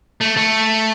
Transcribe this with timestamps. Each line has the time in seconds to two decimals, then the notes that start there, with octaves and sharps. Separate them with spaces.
0.21 A3
0.37 A3